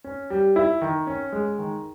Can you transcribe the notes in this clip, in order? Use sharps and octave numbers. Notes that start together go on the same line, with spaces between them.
C#4
G3
E4
D#3
C#4
G#3
D#3